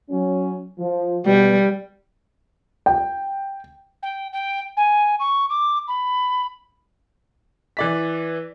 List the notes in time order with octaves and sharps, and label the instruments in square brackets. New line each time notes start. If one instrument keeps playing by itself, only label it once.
[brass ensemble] F#3 C#4
F3
[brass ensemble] B2 [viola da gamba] G3
[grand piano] G5
[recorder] G5
G5
G#5
C#6
D6
B5
[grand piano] E3 D5 B6